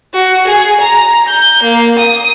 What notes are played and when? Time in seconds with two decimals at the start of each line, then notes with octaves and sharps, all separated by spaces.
0.14 F#4
0.47 G#4
0.80 A#5
1.28 G6
1.63 A#3
1.99 D#6